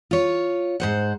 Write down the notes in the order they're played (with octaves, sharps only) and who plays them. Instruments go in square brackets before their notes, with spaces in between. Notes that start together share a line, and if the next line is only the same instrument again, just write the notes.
[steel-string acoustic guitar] F4 C#5
G#2 C5 F#5